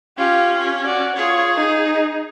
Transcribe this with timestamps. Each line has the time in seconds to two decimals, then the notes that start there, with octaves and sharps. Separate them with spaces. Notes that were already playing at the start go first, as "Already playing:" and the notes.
0.18 C#4 F4 G4
0.85 F#4 D5
1.16 F4 G#4 C#5
1.56 D#4